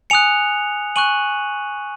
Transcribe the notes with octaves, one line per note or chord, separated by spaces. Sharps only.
G#5 D#6 F#6 C#7 F7
G#5 C#6 F#6 D#7 F#7